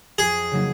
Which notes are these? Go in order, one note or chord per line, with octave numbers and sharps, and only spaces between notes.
F2 G#4
C#3 F#3 A#3 D#4